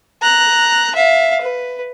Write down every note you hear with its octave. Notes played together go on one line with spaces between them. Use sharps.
A#5 F#6
E5 F5
B4